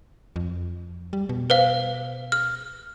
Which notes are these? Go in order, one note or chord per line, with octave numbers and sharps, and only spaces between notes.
F2
G3
B2
B4 C5 F5
F6